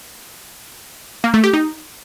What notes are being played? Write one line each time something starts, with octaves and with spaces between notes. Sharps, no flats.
A#3
A3
G4
D#4